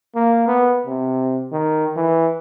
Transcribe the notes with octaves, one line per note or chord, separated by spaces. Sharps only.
A#3
B3
C3
D#3
E3